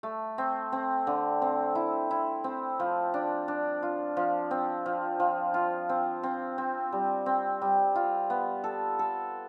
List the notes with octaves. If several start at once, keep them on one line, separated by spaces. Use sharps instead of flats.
A3
C4
C4
D3
C4
E4
E4
C4
F3
D4
D4
F4
F3
C4
F3
F3
F4
C4
C4
C4
G3
C4
G3
F4
B3
A4
A4